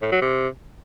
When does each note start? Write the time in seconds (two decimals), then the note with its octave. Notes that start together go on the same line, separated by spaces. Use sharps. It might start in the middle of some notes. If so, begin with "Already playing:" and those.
0.02 A2
0.12 F#3
0.22 C3